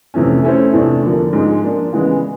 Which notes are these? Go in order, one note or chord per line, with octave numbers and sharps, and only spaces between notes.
F2 C3 E3 A3 C#4
A3 C#4 E4 A4 C5
E2 C3 E3 A3 D4
D3 F3 A#3
G#2 F3 G#3
F3 A#3 D4 F4
C#3 E3 G#3 B3